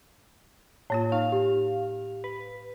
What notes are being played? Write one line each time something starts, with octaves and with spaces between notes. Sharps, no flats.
A2 A#3 F4 C#5
D#4 F5
G4
B4